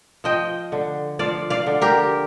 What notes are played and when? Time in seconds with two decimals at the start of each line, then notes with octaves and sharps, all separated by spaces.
0.24 F3 D#5 G5
0.72 D3
1.19 F3 D5 F5
1.50 D5 F5
1.67 D3
1.81 G4 A#4